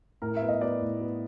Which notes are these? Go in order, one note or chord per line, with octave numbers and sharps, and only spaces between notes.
A2 A#4
E5
B3
D#5
B3 D5
A2
B3